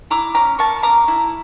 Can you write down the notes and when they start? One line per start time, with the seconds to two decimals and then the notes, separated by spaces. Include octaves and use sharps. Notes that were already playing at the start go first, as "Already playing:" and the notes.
0.11 E4 A#5 D6
0.35 C#4 A#5 D6
0.59 A#3 A5 C#6
0.83 C#4 A#5 D6
1.08 E4